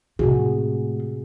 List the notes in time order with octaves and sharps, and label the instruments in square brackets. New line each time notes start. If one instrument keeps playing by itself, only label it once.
[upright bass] A2 [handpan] C3 F#4 G#4